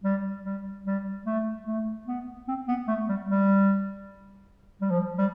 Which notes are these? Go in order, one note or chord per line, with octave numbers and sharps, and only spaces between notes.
G3
G3
G3
A3
A3
B3
C4
B3
A3
G3
G3
G3
F3
G3